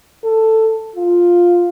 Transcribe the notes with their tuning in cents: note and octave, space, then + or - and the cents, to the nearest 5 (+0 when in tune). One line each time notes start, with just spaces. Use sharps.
A4 +10
F4 +5